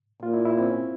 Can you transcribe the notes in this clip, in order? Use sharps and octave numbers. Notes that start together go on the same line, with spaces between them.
A#2 F4
E4
E4
C4
C#4